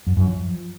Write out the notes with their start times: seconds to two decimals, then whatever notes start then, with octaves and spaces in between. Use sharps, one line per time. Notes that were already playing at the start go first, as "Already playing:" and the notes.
0.07 F#2
0.17 F#2
0.27 F3